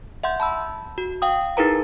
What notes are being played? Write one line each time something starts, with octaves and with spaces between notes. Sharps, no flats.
E5 F#5 C6 G6
A5 B5 E6
F#4
F5 G5 D#6
D#4 E4 G#4 A#4 B4 A#5